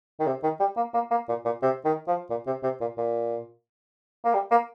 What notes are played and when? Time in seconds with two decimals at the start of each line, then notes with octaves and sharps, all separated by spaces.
0.20 D#3
0.27 C3
0.43 D#3
0.60 G3
0.77 A#3
0.94 A#3
1.11 A#3
1.28 A#2
1.45 A#2
1.62 C3
1.85 D#3
2.08 F3
2.30 A#2
2.47 C3
2.63 C3
2.81 A#2
2.97 A#2
4.25 A#3
4.34 G3
4.51 A#3